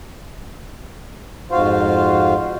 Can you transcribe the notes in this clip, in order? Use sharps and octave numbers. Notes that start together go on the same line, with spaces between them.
F2 G#2 F4 F#4 C5 F5